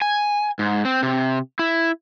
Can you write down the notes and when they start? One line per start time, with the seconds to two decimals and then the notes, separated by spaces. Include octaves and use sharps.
0.02 G#5
0.59 G#2
0.85 C4
1.03 C3
1.59 E4